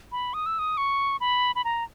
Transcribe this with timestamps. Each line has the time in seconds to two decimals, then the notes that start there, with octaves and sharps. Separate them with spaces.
0.12 B5
0.34 D#6
0.46 E6
0.59 D#6
0.77 C#6
1.20 B5
1.55 B5
1.64 A#5